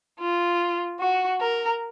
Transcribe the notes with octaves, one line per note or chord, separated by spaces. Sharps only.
F4
F#4
A#4